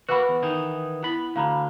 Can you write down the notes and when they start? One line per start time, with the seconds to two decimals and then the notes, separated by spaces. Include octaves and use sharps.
0.09 A#3 F#4 B4 F#5 B5
0.29 E2
0.43 D#3 E3 D#4
1.03 B3 E4 B5
1.36 D2 D3 F5 A#5 B5